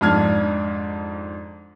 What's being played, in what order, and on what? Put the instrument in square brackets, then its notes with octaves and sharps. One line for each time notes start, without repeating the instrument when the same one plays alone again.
[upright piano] F2 G#2 D4 F6 G#6